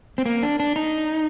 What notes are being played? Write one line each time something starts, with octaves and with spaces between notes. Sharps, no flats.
C4
A#3
D4
D4
D#4